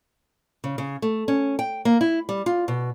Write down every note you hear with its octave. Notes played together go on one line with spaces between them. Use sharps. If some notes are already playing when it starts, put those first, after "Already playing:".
C#3
C#3
A3
C#4
G5
A#3
E4
G3
F4
B2